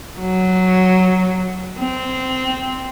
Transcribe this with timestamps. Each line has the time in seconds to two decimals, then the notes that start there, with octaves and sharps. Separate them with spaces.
0.19 F#3
1.79 C4